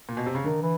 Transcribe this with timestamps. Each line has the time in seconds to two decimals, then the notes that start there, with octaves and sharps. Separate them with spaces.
0.09 A#2
0.17 B2
0.26 C3
0.35 C#3
0.44 D3 D#3
0.62 E3